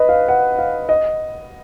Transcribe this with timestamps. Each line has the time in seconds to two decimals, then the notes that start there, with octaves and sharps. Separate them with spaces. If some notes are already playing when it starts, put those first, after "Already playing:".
Already playing: B4 D#5
0.09 F5
0.29 F#5
0.59 F5
0.89 D#5